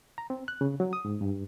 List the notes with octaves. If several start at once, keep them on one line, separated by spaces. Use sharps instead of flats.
A#5
C4
F#6
C#3
F#3
D#6
G#2
G2